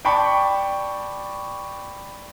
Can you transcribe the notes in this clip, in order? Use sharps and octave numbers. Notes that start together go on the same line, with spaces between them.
D5 G5 A5 B5 C#6